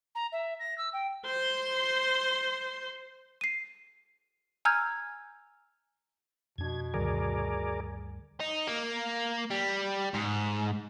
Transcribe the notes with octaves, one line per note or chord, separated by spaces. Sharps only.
A#5
E5
A#6
E6
G5
C5 C6
C7 D#7
G#5 A#5 E6 F6 G6 G#6
F2 B2 D4 G#6
D2 G2 D#3 G#4 A#4 D5
D#4
A#3
G3
G#2